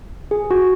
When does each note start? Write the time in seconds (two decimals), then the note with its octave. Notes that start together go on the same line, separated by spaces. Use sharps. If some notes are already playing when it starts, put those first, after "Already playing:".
0.31 G#4
0.51 F#4